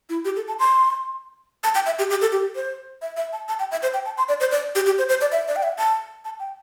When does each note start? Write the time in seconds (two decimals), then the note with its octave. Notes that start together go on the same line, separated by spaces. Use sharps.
0.09 E4
0.25 G4
0.36 A4
0.48 A5
0.59 C6
1.64 A5
1.75 G5
1.86 E5
1.99 G4
2.10 G4
2.21 A4
2.32 G4
2.55 C5
3.02 E5
3.17 E5
3.33 A5
3.48 A5
3.59 G5
3.71 E5
3.82 C5
3.94 G5
4.05 A5
4.18 C6
4.28 D5
4.40 C5
4.51 D5
4.75 G4
4.86 G4
4.98 C5
5.09 C5
5.21 D5
5.32 E5
5.48 D5
5.56 G5
5.63 E5
5.78 A5
6.25 A5
6.39 G5